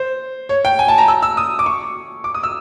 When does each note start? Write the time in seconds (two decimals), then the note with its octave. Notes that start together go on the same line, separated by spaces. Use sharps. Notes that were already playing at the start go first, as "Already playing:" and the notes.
Already playing: C5
0.49 C#5
0.65 G5
0.79 G#5
0.88 A5
0.98 A#5
1.08 E6
1.22 E6
1.37 D#6
1.59 D6
1.66 C#6
2.24 D6
2.35 D#6
2.43 E6